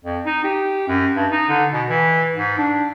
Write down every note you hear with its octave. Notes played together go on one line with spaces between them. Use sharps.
F2
D#4
G4
F#2
G2
D#4
D3
B2
E3
G#2
D4